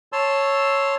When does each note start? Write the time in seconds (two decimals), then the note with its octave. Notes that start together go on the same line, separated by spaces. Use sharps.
0.12 C#5 A5 C6 E6